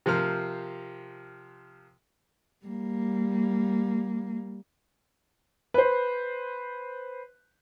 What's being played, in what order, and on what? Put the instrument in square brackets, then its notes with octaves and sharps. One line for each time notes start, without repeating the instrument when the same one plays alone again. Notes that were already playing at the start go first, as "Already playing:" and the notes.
[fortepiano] C3 F3 A#4 F6
[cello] G3 A#3
[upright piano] B4 C5